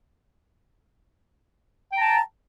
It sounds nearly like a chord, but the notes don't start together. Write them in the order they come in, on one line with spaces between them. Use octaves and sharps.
G5 A#5 A5